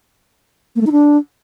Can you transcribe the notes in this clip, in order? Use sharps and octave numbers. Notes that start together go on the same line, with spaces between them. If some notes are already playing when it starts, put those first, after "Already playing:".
A#3
A3
D#4
D4